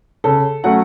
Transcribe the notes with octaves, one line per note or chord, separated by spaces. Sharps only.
C#3 A4
F#3 A3 C#4 F#5